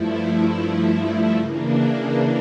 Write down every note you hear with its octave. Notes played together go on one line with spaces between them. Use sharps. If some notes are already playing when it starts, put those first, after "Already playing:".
Already playing: G2 F3 A3 E4
C#3 E3 A#3 D4